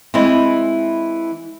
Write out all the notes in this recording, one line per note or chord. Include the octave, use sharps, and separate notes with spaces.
E3 G#3 C4 E4